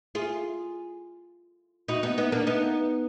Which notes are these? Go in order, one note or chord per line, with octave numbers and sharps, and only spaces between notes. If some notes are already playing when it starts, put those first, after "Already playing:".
F4 G#4
D#4 F#4
B3 D#4
B3 D#4
A#3 D4
B3 D#4